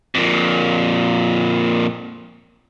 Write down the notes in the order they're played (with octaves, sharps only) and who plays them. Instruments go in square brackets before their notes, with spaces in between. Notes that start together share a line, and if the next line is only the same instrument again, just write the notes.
[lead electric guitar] F2 A#2